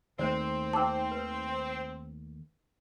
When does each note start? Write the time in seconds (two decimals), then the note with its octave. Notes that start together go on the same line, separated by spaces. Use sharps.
0.19 D#2 D#3 A3 C4 C5 D5
0.73 D#4 C5 G5 A5 D6 E6
1.12 B4